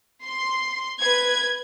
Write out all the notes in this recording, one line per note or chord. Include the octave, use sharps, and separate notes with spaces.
C6
B4 G#6